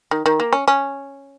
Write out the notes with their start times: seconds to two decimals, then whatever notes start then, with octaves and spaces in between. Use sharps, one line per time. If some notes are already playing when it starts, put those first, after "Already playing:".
0.11 D#3
0.26 D#3
0.40 A#3
0.53 C#4
0.68 C#4